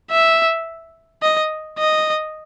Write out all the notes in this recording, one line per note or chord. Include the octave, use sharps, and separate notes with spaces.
E5
D#5
D#5